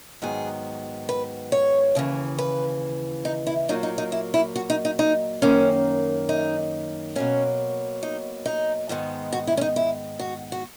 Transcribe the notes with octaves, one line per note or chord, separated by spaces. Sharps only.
G#2 D#3 F#3 B3 G#4
B4
C#5
D#2 C#3 E3
B4
D#4
E4
A#2 F#3 A#3 D#4
D#4
D#4
E4
E4
F#4
D#4
D#4
D#4
F#2 D#3 A#3 C#4
D#4
B2 F#3 A#3 C#4
D#4
D#4
G#2 D#3 G#3 B3
F#4
E4
C#4
D#4
E4
F#4
F#4